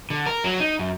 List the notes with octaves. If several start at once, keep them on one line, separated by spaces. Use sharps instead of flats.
D3
A#4
F#3
D#4
F#2